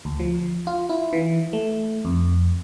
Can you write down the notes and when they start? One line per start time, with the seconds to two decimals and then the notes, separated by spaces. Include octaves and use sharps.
0.05 D2
0.20 F3
0.67 F4
0.89 E4
1.13 E3
1.53 A3
2.05 F2